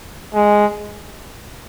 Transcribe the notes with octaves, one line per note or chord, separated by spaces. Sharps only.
G#3